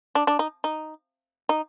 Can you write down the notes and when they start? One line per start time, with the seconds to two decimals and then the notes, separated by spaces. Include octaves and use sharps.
0.15 D4
0.27 D4
0.39 D#4
0.64 D#4
1.49 D#4